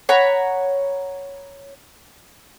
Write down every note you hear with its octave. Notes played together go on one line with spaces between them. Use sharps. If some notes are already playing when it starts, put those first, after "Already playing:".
C#5 F#5 A#5 B5